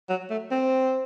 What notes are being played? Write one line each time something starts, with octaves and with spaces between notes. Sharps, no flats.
F#3
A3
C4